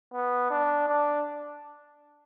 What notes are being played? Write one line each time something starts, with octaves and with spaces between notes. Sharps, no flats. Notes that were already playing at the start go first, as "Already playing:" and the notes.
B3
D4
D4